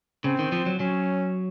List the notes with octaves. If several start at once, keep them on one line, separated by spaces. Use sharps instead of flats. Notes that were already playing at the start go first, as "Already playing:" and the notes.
C#3 C4
D#3
F3
F#3
F#3 C#4